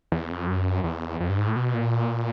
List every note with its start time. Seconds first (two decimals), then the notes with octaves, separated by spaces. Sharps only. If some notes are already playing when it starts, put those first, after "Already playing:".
0.12 E2
0.30 F2
0.47 F#2
0.84 E2
1.20 F2
1.29 G2
1.38 G#2
1.47 A2
1.56 B2
1.74 A#2